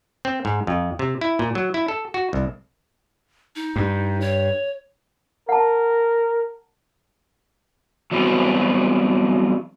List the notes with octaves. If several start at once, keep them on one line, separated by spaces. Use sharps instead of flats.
C4
G#2
F2
C3
E4
A#2
F#3
E4
A4
F#4
C2
D#4
G2
C#5
A#4 F#5 A5
E3 F#3 G3 B3 C4 F#4